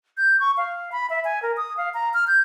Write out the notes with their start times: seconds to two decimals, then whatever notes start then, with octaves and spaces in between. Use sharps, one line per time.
0.17 G6
0.40 C#6
0.57 F5
0.92 B5
1.10 E5
1.25 G#5
1.43 A#4
1.57 D#6
1.77 F5
1.94 A#5
2.14 F6
2.27 G6